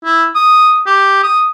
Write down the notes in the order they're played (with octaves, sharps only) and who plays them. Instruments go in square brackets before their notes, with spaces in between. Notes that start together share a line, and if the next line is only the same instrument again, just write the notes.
[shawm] E4
D#6
G4
D#6